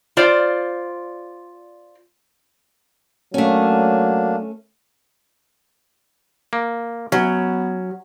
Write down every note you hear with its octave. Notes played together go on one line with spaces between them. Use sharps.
F4 C5 D5
F#3 A3 A#3 C#4 D4
A#3
F#3 B3 C#4